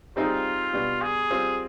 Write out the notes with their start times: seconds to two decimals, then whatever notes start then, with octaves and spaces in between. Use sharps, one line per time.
0.16 G3 C4 D#4 F4 G#4
0.73 B2 G3 D4
1.01 G#4
1.31 G3 C4 F4 C5